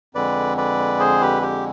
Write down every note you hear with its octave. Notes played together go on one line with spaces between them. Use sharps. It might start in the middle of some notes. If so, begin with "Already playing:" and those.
F2 D3 G#3 B4 D5
B4 D5
G#4 C5
G4 B4
G4